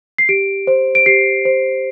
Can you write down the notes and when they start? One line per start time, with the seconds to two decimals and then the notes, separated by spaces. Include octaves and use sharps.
0.18 C7
0.29 G4 D7
0.67 C5
0.95 D7
1.06 G4 C7
1.45 C5